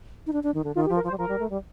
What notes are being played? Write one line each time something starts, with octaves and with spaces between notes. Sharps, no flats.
D#4
D4
D4
D#3
D3
D#3 F4
G4
F3
A#4
F3 C5
G3
F3 A#4
G3
A3
G3